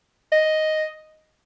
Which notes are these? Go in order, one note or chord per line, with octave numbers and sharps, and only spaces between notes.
D#5